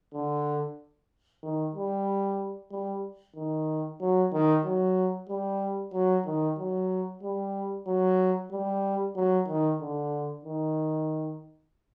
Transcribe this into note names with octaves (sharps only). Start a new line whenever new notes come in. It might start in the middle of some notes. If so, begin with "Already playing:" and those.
D3
D#3
G3
G3
D#3
F#3
D#3
F#3
G3
F#3
D#3
F#3
G3
F#3
G3
F#3
D#3
D3
D#3